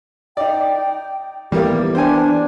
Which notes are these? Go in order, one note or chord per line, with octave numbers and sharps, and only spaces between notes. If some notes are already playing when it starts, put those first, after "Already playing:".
D#4 D5 G5
E3 G3 A#3 B3 G4
D4 C5 G5 G#5